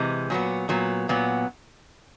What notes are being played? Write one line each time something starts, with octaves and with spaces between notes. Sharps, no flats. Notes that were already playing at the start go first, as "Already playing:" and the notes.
Already playing: C3 E3 G#3
A#2 F#3 B3
A#2 F#3 B3
A#2 F#3 B3